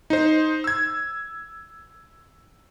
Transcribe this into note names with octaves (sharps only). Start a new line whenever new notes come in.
D#4 C5
E6 G#6